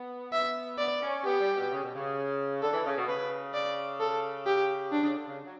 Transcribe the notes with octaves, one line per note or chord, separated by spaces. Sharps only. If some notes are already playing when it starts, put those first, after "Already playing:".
Already playing: B3
E5
B3 D5
C#4
B3 G4
G3
B2
C#3
B2
C#3
D3 A4
E3
C#3
B2
C#3 B4
D5
A4
G4
B2 D4
C#3
D3
C#3
F#3